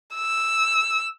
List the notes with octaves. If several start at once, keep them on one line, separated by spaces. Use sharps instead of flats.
E6